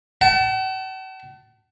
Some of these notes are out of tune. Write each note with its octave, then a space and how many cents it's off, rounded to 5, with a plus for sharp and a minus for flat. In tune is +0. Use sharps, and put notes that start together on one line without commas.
F#5 +45 A5 +0